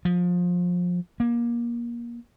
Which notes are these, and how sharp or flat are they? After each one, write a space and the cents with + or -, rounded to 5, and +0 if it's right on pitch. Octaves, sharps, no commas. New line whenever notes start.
F3 +25
A#3 +25